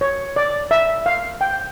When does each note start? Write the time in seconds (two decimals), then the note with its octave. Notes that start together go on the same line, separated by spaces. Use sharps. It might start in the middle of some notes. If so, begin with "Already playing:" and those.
0.01 C#5
0.36 D5
0.71 E5
1.06 F5
1.41 G5